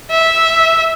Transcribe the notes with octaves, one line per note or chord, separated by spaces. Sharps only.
E5